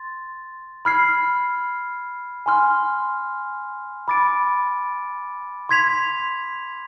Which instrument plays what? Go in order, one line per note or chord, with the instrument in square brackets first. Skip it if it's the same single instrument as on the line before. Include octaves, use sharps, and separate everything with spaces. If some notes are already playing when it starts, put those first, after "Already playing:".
Already playing: [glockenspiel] C6 A6
B5 F6 G#6 C7
G#5 C6 F6
B5 D6 A6 D7
C6 G#6 B6 F7